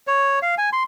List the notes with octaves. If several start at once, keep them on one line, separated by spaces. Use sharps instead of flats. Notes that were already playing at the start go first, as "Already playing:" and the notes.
C#5
F5
G#5
C6